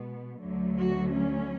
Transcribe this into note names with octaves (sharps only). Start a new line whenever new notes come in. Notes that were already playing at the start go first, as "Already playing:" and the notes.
Already playing: B2 G#3 B3
D2 D3 F#3 A3
F#4
C#4